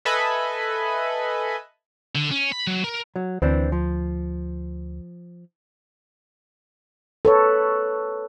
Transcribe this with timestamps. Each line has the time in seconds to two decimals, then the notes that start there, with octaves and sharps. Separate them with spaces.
0.05 A4 B4 D#5 E5 G#5 B5
2.15 D3
2.31 C#4
2.52 B5
2.67 F#3
2.84 A#4
3.16 F#3
3.42 D2 E3 C4 D4
3.72 F3
7.25 A4 B4 C#5